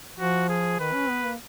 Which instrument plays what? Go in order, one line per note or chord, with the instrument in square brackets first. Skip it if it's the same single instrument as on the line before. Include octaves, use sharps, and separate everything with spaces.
[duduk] F3 [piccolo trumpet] F#4
[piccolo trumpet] G#4
[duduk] D#3 [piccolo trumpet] B4
[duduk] C#4
B3
A#3